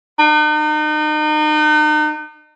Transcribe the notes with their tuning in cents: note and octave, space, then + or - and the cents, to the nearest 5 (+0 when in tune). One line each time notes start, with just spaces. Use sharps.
D#4 -40